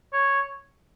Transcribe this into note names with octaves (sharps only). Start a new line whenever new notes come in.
C#5